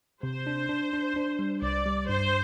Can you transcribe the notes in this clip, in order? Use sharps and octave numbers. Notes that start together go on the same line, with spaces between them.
C3 C5
D4
D4
D4
D4
G3
C2 D5
G3
G2 C5